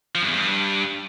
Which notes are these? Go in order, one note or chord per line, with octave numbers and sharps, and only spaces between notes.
F3
G2
E2
G2